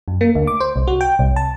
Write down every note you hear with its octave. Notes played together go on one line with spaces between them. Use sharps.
F#2
A#3
D2
D6
C5
C2
F#4
G5
C2
A5